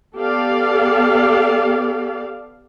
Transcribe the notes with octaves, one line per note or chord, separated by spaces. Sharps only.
B3 G4 A4 D5 F5